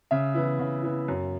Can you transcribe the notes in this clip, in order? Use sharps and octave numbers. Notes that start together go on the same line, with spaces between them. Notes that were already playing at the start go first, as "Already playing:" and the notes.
C#3 E5
E3 B3 E4
C#3
E3 B3 E4
F#2